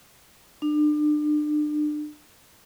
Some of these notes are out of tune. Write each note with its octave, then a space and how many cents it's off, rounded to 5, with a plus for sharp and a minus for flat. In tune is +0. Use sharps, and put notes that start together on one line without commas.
D4 +35